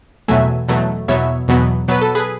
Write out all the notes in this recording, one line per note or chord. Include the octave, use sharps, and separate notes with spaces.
E2 B2 F#3 A3 E5 G#5
E2 B2 F#3 A3
E2 B2 F#3 B3 C#5 E5
E2 B2 F#3 B3
B2 F#3 B3 B4
A4
G#4 B4